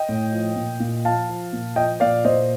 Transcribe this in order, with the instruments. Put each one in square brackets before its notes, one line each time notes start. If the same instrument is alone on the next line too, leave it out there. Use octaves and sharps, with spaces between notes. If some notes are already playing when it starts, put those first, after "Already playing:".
Already playing: [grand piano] D#5 G5
A2
F3
A#2
A#2
F3 F5 A5
F3
A#2
F3 D#5 G5
A#2 D5 F5
A#2 C5 D#5